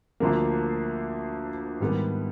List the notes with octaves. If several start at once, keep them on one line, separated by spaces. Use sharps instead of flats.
D2 D3 F3 A#3
G#2 D#3 G3 B3